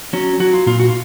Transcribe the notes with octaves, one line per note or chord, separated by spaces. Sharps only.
F#3 C#4
F#3 F#4
F4
A#2 F4
F#4
F4